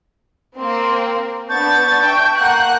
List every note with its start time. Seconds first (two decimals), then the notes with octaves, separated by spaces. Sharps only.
0.57 A#3 C4
1.49 B3 D4 A5 C#6 G6 A6
2.02 E5 G5
2.37 A#3 F#5 F#6